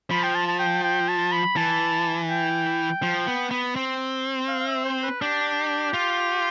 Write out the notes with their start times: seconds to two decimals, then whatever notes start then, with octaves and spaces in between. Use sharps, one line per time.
0.10 F3 B5
0.23 G5
0.35 A5
0.48 A5
0.59 G5
0.83 G5
1.08 A5
1.32 B5
1.56 E3 A5
2.29 G5
3.03 F3
3.27 B3
3.51 B3
3.76 C4
4.48 F5
4.60 F5
4.67 E5
4.84 C5
5.03 B4
5.21 D4 G4
5.94 F4